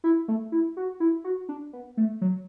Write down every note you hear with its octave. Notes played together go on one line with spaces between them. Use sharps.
E4
A3
E4
F#4
E4
F#4
D4
B3
A3
F#3